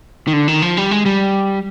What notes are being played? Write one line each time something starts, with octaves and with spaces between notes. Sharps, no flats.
D#3
D3
D#3
F3
G3
G#3
G3